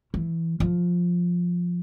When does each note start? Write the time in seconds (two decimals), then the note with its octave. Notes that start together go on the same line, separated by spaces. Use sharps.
0.14 E3
0.60 F3